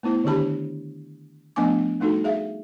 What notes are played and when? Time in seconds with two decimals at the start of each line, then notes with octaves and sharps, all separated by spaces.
0.03 A3 B3 E4 C5
0.24 D3 D#3 D4 G4 A5 B5
1.56 F3 A3 B3 D4 G#5 D6
2.00 G3 A3 D#4 F#4 A4
2.24 G#4 E5 F5